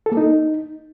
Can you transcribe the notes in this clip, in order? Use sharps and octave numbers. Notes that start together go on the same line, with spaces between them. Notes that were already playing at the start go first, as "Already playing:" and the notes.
A4
A#3
D#4